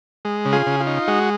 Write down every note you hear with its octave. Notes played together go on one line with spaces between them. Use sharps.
G#3
C#3
F4 G#4
C#3
F4
D#4
G#3 F#4